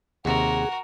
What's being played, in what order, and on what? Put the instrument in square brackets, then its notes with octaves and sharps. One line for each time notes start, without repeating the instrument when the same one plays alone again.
[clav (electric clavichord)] D#2 C3 [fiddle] F#4 A#4 [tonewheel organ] G#4 [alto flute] F#5